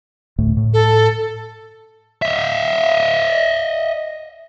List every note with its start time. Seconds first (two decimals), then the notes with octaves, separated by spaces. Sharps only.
0.39 D2 A2 A3
0.57 A2
0.73 A4
2.22 D#5 E5